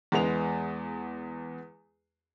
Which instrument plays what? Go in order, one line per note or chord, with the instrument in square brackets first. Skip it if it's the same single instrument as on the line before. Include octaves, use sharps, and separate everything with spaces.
[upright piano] E2 G#3 B3 F7